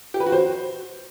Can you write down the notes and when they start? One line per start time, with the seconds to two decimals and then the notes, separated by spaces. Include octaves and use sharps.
0.14 G4
0.20 B4
0.26 F#4
0.32 C5